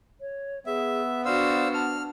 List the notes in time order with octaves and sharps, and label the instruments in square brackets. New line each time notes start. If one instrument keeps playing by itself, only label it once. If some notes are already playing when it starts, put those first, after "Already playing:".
[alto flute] C#5
[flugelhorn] B3 [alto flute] G#4 [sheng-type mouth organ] E5
[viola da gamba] D4 F#4 [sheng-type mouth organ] C5 F5 E6 [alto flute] D5
[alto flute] A5 [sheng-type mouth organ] F6